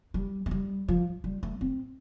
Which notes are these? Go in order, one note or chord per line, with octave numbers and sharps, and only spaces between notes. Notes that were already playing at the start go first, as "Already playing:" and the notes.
G3
A3
G3
F3
G3
A3
C4